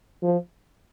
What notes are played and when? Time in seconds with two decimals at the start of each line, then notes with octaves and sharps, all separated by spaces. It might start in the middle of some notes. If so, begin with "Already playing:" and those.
0.23 F3